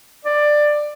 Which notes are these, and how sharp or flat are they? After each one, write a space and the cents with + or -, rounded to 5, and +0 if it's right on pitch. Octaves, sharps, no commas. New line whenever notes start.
D5 +15